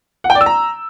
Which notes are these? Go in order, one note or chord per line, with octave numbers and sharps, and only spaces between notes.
F#5
G5
D5
E6
A#5